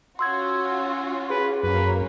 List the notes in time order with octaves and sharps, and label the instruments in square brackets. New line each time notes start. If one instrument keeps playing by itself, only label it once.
[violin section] C#4 F4 F#4 [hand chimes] C6 E6 G#6
[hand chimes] G#4 [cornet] B4
[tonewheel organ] F#2 [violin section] A#3 C#4 [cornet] B4